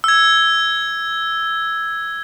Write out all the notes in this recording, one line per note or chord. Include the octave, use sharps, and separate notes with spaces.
E6 G#6